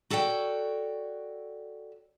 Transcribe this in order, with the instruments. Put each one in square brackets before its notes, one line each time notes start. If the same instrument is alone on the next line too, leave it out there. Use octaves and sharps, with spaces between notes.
[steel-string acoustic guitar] F#4 A4 C#5 D5 F5 G5